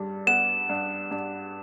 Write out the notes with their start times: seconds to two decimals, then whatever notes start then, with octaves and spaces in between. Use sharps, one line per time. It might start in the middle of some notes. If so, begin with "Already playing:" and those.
Already playing: G2 G3
0.27 B3 E7
0.69 G2
1.11 G2